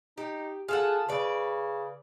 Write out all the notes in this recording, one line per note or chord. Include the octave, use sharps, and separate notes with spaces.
D#4 G4
F4 G#4 A4 F#5
C#3 B4 D5